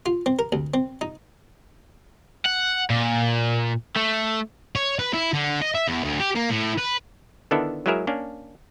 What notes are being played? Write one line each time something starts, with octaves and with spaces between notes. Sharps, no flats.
F4
C4
A#4
D2
C4
D#4
F#5
A#2
A3
C#5
B4
E4
D3
D#5
E5
E2
D2
G4
A#3
A2
B4
D3 D#3 B3 D4 E4 A4
F#3 G#3 E4 G#4 A#4 E5
A#3 C#4 D4